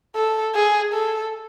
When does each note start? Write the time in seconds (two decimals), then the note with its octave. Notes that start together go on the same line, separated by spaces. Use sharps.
0.16 A4
0.55 G#4
0.93 A4